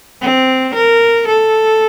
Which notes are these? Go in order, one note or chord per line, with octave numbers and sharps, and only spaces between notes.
C4
A#4
A4